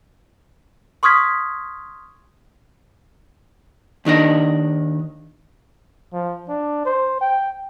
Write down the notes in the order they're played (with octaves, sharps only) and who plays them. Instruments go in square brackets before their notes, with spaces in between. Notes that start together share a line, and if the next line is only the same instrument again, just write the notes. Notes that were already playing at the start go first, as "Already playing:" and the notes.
[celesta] C6 C#6 D#6 F6 G#6 B6
[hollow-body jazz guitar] D#2 D#3 D4 D#5
[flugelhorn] F3
D4
C5
G5